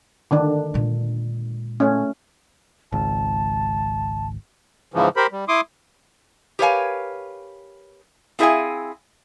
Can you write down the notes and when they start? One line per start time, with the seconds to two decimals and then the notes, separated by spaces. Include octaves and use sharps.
0.31 D3 D#3 D4
0.74 A#2 G#3
1.80 A3 C#4
2.92 G#1 C#2 A5
4.94 G#2 C#3 E3 F3
5.16 G4 A#4 C5 B5
5.32 G3
5.48 E4 C6 D6 D#6
6.59 G4 A#4 B4 C#5 F5 G#5
8.39 C4 E4 G#4 C#5 F5 G#5